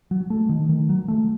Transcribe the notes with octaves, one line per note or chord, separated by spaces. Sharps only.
F#3
A3
D#3
D#3
F#3
A3